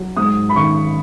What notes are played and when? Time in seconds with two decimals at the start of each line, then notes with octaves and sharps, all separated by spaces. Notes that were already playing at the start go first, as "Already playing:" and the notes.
Already playing: F#3
0.16 G#2 D#6
0.49 B5
0.56 D#3 C#6